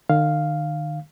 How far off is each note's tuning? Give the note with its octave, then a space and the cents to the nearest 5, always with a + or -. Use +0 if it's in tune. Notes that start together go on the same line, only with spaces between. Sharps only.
D#3 -40 F5 +0